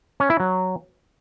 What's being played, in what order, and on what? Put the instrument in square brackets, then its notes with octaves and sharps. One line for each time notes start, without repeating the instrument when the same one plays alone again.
[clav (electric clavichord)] C#4
E4
F#3